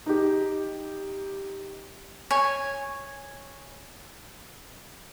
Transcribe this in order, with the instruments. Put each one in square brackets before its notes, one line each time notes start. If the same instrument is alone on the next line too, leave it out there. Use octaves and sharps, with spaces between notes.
[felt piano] D#4 G4
[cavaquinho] C#5 G#5